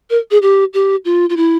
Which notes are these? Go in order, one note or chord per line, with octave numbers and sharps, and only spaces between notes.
A#4
G#4
G4
G4
F4
F4
E4